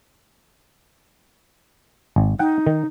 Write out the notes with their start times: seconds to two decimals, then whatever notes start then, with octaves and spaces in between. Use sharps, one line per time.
2.16 G#1
2.39 D#4 F#5 G5
2.67 D#3